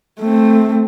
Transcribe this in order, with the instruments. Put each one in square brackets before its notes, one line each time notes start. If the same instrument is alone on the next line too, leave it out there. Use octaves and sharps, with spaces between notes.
[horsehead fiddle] A3 C4